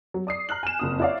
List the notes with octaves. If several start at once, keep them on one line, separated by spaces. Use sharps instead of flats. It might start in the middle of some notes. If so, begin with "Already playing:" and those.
F#3
D5 D#6 C7
A#5 F6 F#6 F#7
G#5 E7
F#1 F2 D#6
E4 C#5 D5 E5 F5